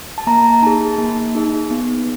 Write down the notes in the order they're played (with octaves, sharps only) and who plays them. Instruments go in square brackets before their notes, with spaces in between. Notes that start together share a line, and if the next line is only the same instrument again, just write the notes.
[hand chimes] A5
A#3 A#5
D#4 G#4 A5
A#3
D#4 G#4
B3